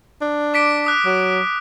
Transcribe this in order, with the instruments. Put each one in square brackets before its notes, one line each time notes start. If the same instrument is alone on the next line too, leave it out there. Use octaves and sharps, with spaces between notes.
[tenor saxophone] D4
[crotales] D6 B6 D7
D#6 F#6
[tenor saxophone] F#3